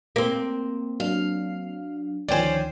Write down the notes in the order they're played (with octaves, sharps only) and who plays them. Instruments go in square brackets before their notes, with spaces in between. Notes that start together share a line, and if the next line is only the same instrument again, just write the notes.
[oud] A#3 C4
[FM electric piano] F#3 D4 [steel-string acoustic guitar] F5
[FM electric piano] D2 D#3 F3 [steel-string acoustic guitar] C#4 C5 [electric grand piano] D5 G5 G#5